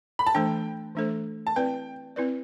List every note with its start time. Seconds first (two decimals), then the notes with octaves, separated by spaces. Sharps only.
0.19 B5
0.27 A5
0.35 E3 A3 D4 A4 C5 G5
0.95 E3 A3 D4 A4 C5
1.47 A5
1.56 C4 E4 B4 D5 G5
2.16 C4 E4 B4 D5